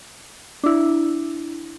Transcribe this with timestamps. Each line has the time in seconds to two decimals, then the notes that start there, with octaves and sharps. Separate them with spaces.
0.63 D4 E4